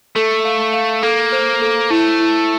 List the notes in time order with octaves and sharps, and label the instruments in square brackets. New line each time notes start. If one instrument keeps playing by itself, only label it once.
[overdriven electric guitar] A3 [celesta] A4
[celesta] F5
F5
[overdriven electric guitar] A#3 [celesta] A4
[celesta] C5
A4
[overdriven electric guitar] A3 [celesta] E4
[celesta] E4